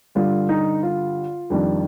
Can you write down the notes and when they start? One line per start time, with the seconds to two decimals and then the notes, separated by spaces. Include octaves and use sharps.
0.15 G2 D3 G3 F4
0.49 D#4
0.83 F4
1.50 F2 D#3 G3 D4